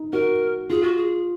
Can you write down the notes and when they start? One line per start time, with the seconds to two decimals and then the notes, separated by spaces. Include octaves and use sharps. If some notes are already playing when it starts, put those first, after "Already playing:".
Already playing: D#4
0.13 F#4 A#4
0.70 F4 G#4
0.84 F#4
0.97 G#4